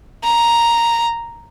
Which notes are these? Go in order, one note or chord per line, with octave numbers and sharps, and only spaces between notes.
A#5